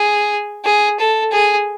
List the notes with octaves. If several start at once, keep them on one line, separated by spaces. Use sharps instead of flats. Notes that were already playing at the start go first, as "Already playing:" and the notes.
Already playing: G#4
G#4
A4
G#4